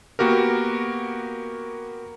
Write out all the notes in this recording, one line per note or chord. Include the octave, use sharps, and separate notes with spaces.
A#3 B3 F#4 G4 A#4